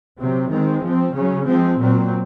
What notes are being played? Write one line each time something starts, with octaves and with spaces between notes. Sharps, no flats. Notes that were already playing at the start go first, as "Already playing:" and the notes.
C3 F#3 C4
D#3 G#3 C4
F3 C4
C#3 F#3 C#4
F3 G#3 C4
A#2 F#3 C4